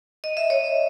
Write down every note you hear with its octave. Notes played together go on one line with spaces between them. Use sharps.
D#5
E5
C#5 D#5